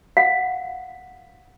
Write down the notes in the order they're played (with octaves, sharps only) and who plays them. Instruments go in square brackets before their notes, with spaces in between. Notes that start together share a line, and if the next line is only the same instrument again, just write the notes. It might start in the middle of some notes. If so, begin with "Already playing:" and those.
[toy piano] F5 F#5